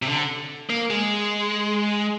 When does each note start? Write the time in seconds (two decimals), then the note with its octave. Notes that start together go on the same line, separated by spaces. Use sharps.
0.02 C3
0.07 D3
0.70 A#3
0.90 G#3